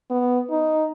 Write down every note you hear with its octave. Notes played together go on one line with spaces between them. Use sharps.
B3
D#4